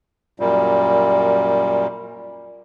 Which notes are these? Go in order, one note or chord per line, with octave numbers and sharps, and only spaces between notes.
F#2 A#2 G3